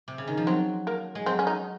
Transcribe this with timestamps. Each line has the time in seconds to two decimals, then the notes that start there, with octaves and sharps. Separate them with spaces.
0.08 C3
0.18 C#3
0.27 D#3
0.37 F3
0.47 F#3 C4
0.87 A#3
1.15 G#3
1.26 F#3 C4
1.39 C#4
1.47 D#4